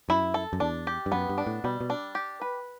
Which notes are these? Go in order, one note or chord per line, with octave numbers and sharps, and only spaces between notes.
F#2 E4
A4
F#2
E2 D4
G4
G2
F#2 B3
G2
D4
A2
B2 G3
B2
D4
G4
B4